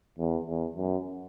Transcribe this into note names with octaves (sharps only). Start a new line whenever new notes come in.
E2
E2
F#2